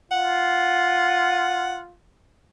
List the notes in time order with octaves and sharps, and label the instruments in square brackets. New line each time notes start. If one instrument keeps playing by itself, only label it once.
[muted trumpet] F4 [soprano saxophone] F#5